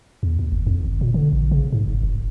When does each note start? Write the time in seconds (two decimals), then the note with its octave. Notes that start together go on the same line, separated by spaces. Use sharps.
0.23 E2
0.39 D#2
0.52 G1
0.67 F2
0.85 G1
1.01 A#2
1.14 D3
1.33 A1
1.51 C#3
1.73 G#2
1.87 F#1
2.03 F1